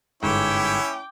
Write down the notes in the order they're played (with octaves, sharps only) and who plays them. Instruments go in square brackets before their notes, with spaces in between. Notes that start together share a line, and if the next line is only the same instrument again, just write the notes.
[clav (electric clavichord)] G1 G#2 [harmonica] C#4 E4 C#5 [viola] G5 D6